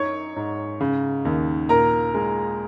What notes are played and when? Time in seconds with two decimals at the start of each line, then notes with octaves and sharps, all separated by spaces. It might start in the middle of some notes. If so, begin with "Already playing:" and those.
Already playing: F#2 D#4 C#5 C#6
0.36 G#2
0.80 C#3
1.25 D#2
1.69 A#2 A#4 A#5
2.14 G#3